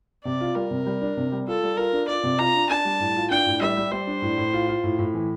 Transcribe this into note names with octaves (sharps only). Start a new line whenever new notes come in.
C3 D5
F4
G3 A#4
C3
G3
D4
C3
G3
F4 A4
G3
F4 A#4
D4
F4 D5
C3
F4 A#5
D4
D4 A5
G3
A2
F4
D4 G5
A2
G3 E5
G3
G3 C5
D4
A2
A2
F4
F4
A2
A2
E3